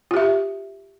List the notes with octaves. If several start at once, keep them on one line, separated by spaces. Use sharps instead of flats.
F4 G4 E5